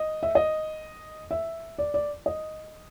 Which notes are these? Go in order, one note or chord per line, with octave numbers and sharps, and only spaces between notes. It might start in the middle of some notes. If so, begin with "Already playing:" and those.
Already playing: D#5
E5
D#5
E5
D5
D5
D#5